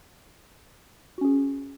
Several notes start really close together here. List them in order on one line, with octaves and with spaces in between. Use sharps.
F#4 C#4 G#4